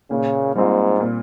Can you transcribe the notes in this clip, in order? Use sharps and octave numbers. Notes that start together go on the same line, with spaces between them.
A#2 C#3
G#2 G3 C4 F4
A#2